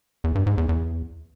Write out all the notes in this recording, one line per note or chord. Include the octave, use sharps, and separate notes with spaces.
E2
G2
G#2
E2
E2